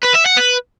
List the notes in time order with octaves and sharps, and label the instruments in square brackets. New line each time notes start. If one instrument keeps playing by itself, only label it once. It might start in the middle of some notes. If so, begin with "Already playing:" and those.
[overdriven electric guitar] B4
E5
F#5
B4